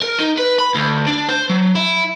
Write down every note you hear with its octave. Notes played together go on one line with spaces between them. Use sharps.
A#4
D#4
B4
B5
D2
D4
C5
F#3
E4